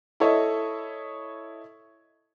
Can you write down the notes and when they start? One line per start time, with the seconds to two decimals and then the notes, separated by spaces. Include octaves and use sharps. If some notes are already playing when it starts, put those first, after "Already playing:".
0.20 E4 A4 C#5 D#5 E5